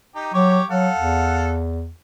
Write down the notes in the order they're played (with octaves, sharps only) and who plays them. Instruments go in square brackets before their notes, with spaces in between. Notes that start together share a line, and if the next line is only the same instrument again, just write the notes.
[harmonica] D#4 G4
[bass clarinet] F#3 [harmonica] G4 C#5 D6
[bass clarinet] F#3 [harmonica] A4 F5 F#5
[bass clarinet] E2